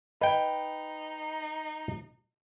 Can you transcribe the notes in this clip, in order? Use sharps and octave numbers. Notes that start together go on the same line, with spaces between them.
D#4 B4 D#5 G5